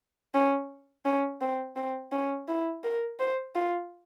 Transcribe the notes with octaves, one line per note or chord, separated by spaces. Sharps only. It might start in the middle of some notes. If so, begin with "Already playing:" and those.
C#4
C#4
C4
C4
C#4
E4
A#4
C5
F4